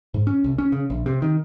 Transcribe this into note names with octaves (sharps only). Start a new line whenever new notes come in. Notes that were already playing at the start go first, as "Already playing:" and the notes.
G#2
C#4
C2
C#4
C#3
A#1
C3
D#3